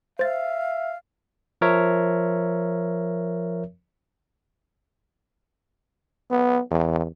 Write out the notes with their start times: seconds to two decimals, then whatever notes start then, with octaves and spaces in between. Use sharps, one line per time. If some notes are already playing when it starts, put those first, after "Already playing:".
0.19 C5 E5 F5 A6
1.61 F3 A#4 C#5 E5
6.31 B3
6.71 E2